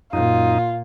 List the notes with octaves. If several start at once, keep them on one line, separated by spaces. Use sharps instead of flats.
F#2 A#2 D#4 F4